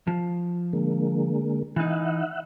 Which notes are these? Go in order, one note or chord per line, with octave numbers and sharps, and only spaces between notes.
F3
D3 G#3 A#3
E3 D#4 E5 F#5